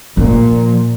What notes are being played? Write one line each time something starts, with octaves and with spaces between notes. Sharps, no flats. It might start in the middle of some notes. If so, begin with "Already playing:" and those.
A#2 F3